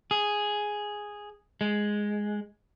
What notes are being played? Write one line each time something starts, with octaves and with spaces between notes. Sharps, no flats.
G#4
G#3